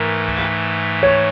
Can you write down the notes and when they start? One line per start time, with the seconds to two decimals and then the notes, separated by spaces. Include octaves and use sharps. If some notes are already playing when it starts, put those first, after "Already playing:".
Already playing: G#2 E3 A3 A#4
1.03 C#5